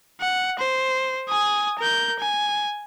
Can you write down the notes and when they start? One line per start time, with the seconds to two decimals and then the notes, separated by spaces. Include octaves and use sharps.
0.21 F#5
0.59 C5
1.29 G#5 D#6
1.79 A#4 G6
2.19 G#5